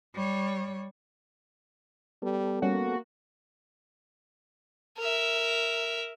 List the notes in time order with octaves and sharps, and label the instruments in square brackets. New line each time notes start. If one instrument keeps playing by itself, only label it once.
[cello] G3 C#5
[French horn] G3 [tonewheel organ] B3 A4
[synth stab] G3 C#4 [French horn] A#3 [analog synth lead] F#4
[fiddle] A#4 E5